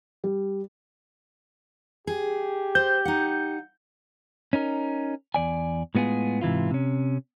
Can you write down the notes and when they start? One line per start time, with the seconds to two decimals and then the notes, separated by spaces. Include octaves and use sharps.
0.24 G3
2.07 G4 G#4
2.75 C5 G6
3.05 D#4 F#5
4.53 C#4 D#4 A#4
5.34 E2 D5 G#5
5.95 A2 G#3 B3 F4 G#4
6.41 G#2 C3 E3 E4 F4
6.71 C3 C#4